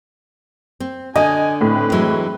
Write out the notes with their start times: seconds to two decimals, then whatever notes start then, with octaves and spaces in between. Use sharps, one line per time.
0.80 C4
1.16 D3 D#5 G#5
1.61 A2 C4 B4
1.92 E3 F#3 G#3